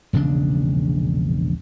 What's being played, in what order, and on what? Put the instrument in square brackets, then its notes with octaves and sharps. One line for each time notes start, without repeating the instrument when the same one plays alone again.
[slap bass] E1 A#1 C#3 D4